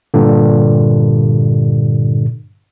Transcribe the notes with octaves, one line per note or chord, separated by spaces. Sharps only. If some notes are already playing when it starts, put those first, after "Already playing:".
G2 A#2 D3